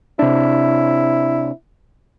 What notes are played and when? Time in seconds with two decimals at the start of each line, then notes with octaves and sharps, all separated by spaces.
0.19 C3 D4 E4